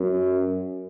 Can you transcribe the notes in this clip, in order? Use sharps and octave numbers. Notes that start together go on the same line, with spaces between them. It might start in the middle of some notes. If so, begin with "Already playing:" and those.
Already playing: F#2